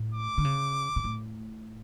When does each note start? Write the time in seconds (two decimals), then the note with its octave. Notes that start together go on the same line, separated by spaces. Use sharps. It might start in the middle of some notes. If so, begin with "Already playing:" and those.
Already playing: A2
0.14 D6
0.38 D3
0.45 C#3
0.96 B2
1.04 A2